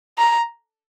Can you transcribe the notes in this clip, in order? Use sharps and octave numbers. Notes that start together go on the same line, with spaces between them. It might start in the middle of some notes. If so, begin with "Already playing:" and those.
A#5